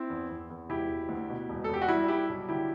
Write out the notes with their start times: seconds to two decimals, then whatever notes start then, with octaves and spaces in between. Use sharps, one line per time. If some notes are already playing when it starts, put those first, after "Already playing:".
Already playing: C4 E4
0.10 E2
0.29 E2
0.50 E2
0.69 E1 E4 G4
0.89 E1
1.09 D2
1.30 B2
1.49 E1
1.64 A4
1.69 E2 G4
1.82 F#4
1.88 G3 E4
2.08 G3 E4 G4
2.29 B1
2.49 D3 E4 G4